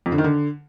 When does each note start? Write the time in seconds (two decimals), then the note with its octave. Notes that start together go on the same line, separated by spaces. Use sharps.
0.06 F2
0.12 D3
0.18 D#3
0.24 D3